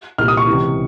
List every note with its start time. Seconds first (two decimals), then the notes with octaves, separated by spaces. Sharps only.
0.18 C2 A#2 F6
0.28 D#6
0.37 C#6
0.47 C#2 C3 E3